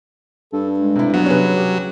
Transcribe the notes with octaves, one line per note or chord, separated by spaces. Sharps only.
G2 A4
G#3
C3 E4
F#3 B3
C3 C#4 G#4 B4
G4